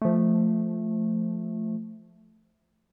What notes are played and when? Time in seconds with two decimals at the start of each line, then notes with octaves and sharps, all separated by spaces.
0.02 F3 A3